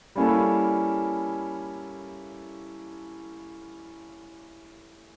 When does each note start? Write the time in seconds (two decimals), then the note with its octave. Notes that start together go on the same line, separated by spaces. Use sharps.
0.16 G3 A#3 C#4 E4 A4